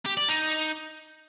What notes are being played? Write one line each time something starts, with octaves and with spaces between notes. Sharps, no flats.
G4
D5
D#4